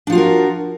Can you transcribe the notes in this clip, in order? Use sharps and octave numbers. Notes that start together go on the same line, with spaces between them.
F3 D4 F4 F#4 A#4